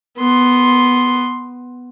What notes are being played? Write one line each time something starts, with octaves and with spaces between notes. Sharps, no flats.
B3 C6